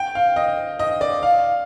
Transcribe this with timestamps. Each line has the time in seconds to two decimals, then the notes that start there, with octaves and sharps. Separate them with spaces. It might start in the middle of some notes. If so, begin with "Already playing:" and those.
Already playing: G5
0.15 F5
0.36 D#5
0.79 D#5
1.01 D5
1.23 F5